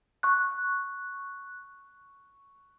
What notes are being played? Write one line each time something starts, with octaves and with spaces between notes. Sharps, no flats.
C#6 F#6